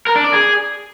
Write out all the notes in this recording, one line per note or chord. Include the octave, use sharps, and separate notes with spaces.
A#4
D4
D5
G#4